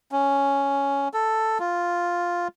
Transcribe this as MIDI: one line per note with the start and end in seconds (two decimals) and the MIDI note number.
0.12 1.08 61
1.14 1.58 69
1.59 2.48 65